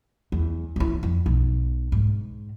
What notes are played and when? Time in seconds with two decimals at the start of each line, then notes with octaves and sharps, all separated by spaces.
0.32 E2
0.76 F#2 E3
1.03 F2
1.26 B1
1.92 G#2